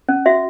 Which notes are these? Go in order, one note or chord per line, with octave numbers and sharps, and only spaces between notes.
C#4
F#4 E5